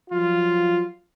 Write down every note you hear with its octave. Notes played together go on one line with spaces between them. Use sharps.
F3 F#3 F4